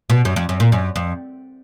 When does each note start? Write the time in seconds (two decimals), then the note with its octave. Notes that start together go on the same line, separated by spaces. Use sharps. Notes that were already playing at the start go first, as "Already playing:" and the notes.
0.10 B2
0.25 F#2
0.36 F2
0.49 F#2
0.60 A#2
0.72 F#2
0.96 F2